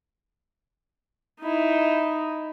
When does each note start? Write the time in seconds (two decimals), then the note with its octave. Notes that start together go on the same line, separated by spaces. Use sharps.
1.41 D#4 E4